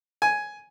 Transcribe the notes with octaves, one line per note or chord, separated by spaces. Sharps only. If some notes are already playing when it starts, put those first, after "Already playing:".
G#5